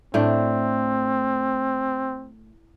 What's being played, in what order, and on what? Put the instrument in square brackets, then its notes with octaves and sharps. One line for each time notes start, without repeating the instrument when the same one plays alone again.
[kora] A2 A3 D4 [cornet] C4